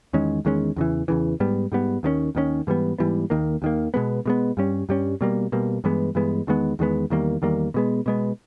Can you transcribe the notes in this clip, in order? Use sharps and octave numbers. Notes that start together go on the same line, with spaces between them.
E2 D#3 G#3 C#4
E2 D#3 G#3 C#4
E2 C#3 E3
E2 C#3 E3
G#2 G3 B3
G#2 G3 B3
D#2 D#3 A#3 C#4
D#2 D#3 A#3 C#4
G#2 E3 G3 B3
G#2 E3 G3 B3
D#2 D#3 A#3
D#2 D#3 A#3
B2 G#3 B3
B2 G#3 B3
G2 G3 C#4
G2 G3 C#4
B2 G3 A#3
B2 G3 A#3
G2 E3 G#3 B3
G2 E3 G#3 B3
E2 D#3 G#3 B3
E2 D#3 G#3 B3
E2 D#3 G3 A#3
E2 D#3 G3 A#3
B2 G#3 B3
B2 G#3 B3